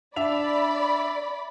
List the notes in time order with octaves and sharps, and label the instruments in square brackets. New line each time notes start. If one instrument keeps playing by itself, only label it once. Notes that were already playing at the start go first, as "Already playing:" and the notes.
[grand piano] D4 E5 F7 [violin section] D5 B5